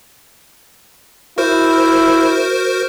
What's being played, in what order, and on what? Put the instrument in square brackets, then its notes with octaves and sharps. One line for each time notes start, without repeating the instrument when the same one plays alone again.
[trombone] E4 [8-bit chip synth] F#4 A#4 C5